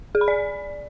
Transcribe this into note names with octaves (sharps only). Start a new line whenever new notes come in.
G#4
B5
D5